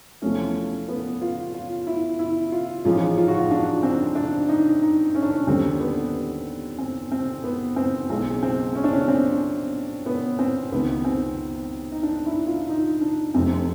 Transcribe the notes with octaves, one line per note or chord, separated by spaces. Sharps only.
E2 C3 F3 A3 C#4
B3
F4
F4
E4
E4
F4
A1 G#2 F3 G#3 F4
F4
F#4
F4
D4
C4
D4
D#4
D#4
C#4
D4
C#4
D#2 D3 G3 C4
B3
C4
C4
B3
C4
B1 B2 G#3 C4
C4
C#4
D4
C#4
C4
B3
C4
C#2 C3 D#3 B3
C4
D#4
D4
E4
F4
D#4
D4
F1 F2 C3 C4